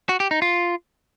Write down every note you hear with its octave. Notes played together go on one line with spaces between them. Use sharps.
F#4
G4
D#4
F4